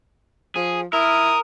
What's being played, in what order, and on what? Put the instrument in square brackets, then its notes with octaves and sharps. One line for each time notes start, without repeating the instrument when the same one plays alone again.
[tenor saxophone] F3 [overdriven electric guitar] G#4
[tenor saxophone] E4 [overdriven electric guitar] A#4 [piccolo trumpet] D#6